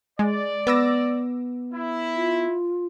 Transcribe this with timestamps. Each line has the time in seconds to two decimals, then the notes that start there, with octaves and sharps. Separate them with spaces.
0.19 G#3 D5
0.67 B3 D6 E6 A#6
1.74 E4
2.14 F4